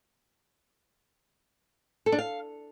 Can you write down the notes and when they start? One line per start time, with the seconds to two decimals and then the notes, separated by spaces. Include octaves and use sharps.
2.06 A4
2.12 D4
2.19 F5